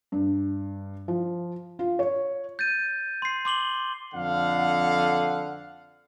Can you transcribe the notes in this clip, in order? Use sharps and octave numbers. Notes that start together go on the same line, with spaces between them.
G2
F3
F4
C#5
G6 A6 D#7
C6 C7
C6 D6 F#7 G7
F2 D3 F5 F#5